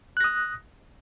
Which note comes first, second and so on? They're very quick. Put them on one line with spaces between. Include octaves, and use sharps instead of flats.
F#6 A#6 D#6